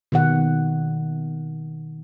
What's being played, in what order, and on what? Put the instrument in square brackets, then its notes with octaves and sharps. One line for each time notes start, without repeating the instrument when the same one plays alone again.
[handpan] B2 D#3 F#5